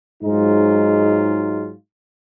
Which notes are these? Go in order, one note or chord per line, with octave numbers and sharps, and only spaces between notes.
G#2 F#3 G#3 D#4 F4